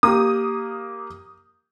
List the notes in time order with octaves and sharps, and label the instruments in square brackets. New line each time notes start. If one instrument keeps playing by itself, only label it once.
[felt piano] A#3 G4 [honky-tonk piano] D#6